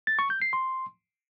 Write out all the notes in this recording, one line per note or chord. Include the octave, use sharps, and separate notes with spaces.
A6
C#6
G6
C7
C6